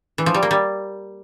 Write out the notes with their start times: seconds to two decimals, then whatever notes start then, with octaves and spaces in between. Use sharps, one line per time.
0.18 E3
0.26 F3
0.34 G3
0.43 A#3
0.51 G3